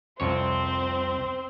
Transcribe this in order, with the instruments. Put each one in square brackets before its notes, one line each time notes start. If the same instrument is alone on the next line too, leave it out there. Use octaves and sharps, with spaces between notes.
[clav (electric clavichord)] C2 F2 C#5 [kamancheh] C4 C5